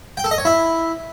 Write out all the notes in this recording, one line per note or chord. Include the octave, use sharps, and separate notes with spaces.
G5
A4
D#5
C#5
E4